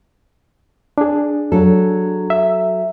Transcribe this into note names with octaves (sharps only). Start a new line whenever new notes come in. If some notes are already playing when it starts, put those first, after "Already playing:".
D4 G#4
F#3 A4
E5